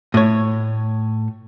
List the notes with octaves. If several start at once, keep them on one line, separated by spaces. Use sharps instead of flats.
A2 C#5